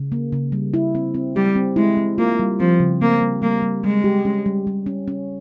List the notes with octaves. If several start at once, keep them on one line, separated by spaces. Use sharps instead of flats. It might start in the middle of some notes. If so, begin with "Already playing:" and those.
Already playing: C#3
A#3
C#3
G3
E4
C4
C4
G3 G4
C4
G#3 E4
C4
A#3 F4
G3
F3 C4
C#3
A#3 C4
G3
G3 A#3
G3
G3 G#3
G4
C#4
G3
G3
C#4
C#4